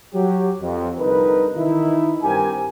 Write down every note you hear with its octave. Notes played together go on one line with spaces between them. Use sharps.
F#3 G4
F2
C2 D3 D#4 A#4 B4
D#3 E3 D#4 E4
G2 C4 G4 A#4 G#5